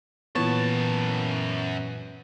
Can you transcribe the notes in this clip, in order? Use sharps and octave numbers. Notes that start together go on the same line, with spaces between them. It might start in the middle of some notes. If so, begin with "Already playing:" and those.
F#2 A#2 E3 B3 C#5 A5 A6